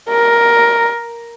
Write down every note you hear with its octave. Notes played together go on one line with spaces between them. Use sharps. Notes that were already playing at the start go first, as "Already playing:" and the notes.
A#4